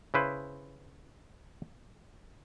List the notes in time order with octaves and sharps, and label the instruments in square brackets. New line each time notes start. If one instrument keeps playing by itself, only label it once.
[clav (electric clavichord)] C#3 E4 B4 C5